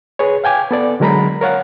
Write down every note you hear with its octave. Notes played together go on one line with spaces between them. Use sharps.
G#4 B4 C#5
F5 G5 G#5 D6
B3 A4 D5
D3 F#3 G#3 A#4 A#5 B5
A#4 C#5 F5 F#5